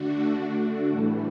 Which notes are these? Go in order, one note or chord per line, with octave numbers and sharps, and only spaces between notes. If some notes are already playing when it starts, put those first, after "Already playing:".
Already playing: D3 A3 D4 F#4
D4 F#4
A2 E3 G3